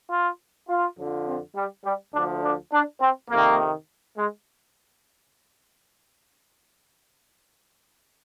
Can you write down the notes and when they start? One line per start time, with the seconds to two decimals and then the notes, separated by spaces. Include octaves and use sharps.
0.11 F4
0.69 F4
0.98 F2 D3 F3
1.27 C4
1.56 G3
1.85 G3
2.14 D2 D3 F3 D4
2.44 D4
2.73 D4
3.01 C4
3.30 F2 C3 D#3 A#3
4.18 G#3